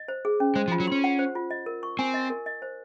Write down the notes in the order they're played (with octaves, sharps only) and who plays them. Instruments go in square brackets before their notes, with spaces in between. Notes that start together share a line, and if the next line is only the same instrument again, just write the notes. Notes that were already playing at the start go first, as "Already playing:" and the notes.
Already playing: [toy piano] D#5
C5
G#4
C#4
[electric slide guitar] G#3 [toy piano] C5
[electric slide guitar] F3
[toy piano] F4
[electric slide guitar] F#3
[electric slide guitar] C#4 [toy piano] C6
[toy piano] F#5
C5
F4
D#5
A#4
C#6
[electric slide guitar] C4 [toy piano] G#5
[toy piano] D#5
A#4
D#5
C5